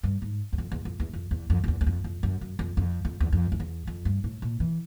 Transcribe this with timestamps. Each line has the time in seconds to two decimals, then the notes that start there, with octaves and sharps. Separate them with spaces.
0.03 G2
0.22 G#2
0.53 E2
0.58 F2
0.72 E2
0.85 F2
1.00 E2
1.13 F2
1.31 E2
1.50 F2
1.64 F2
1.68 E2
1.81 E2
1.86 F2
2.04 F2
2.23 F#2
2.41 F#2
2.59 F2
2.77 F2
3.05 F2
3.20 E2
3.32 F2
3.52 F2
3.60 E2
3.87 F2
4.05 G2
4.24 A2
4.42 A#2
4.60 E3